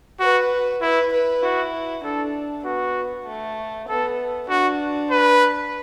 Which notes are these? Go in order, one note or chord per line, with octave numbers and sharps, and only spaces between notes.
F#4 B4
E4 B4
B4
E4 F#4
D4 A4
B3 F#4
A3
B3 A4
D4 F#4
B4